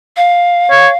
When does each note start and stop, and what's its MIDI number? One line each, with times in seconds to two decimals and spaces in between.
0.17 0.98 77
0.70 0.89 73